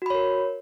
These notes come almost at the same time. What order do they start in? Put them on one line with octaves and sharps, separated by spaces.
F#4 B5 C#5 A#4